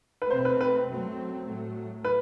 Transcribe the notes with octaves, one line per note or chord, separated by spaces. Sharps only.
B4
B2 A3 C4 C5
B4
B4
F#2 F#3 A3 C4
A2 F#3 A3
B4